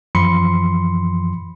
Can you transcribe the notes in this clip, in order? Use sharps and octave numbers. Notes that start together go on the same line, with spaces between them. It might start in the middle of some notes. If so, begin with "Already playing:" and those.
F#2 E3 F3 B5 C6 C#7